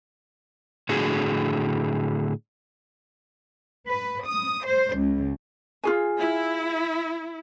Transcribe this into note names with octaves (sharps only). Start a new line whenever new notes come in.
A2 D3 F#4 G#4
B4
D#6
C5
C#2
F4 G#4 G#5
E4